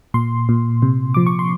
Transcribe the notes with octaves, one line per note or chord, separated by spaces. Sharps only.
A#2 C6
A#2
C3
F3 D6
C#6
C6